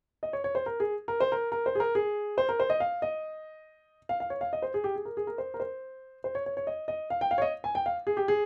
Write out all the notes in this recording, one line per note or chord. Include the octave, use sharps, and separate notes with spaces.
D#5
C#5
C#5
C5
A#4
G#4
A#4
C5
A#4
A#4
C5
G#4
A#4
G#4
C5
A#4
C5
D#5
F5
D#5
F5
F5
C#5
F5
D#5
C5
G#4
G4
G#4
A#4
G#4
A#4
C5
A#4
C5
C5
C#5
C#5
C#5
D#5
D#5
F5
G5
F5
C#5
D#5
G#5
G5
F5
G#4
G4
G#4